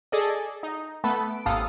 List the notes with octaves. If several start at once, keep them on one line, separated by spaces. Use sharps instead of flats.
G#4 A4 D5 D#5
D#4
A3 B3 A4 B4
D7
G#1 D#2 A4 F5 D#6